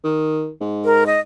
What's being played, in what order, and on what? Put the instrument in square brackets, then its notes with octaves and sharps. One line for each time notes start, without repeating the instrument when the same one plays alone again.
[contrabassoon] D#3
G#2
[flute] A#4
D#5